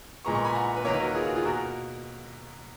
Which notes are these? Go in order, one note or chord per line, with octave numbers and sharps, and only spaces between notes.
A#2 G#3 B3 A#5 C#6
A#5 C#6
G#5 B5
F#5 A#5
B4
D#2 D#3 A#3 A#4 C#5
B4
F#4 A#4
F4 G#4
F#4
F4 G#4
B2 A#3 F#4 A#4